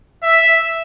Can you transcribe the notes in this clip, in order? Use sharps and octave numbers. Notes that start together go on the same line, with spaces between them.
E5